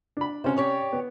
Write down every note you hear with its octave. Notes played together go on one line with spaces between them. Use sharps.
D4 B5
C3 C#4 F4 A4 C5
G4 C#5 D5
B3